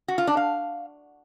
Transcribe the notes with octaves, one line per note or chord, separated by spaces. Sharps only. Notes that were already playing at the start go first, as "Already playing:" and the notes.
F#4
F4
D4
F5